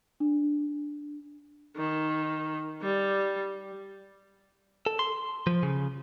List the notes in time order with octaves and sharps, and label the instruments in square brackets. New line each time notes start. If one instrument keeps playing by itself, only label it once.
[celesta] D4
[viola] D#3
G3
[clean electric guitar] A4
C6
F3
C#3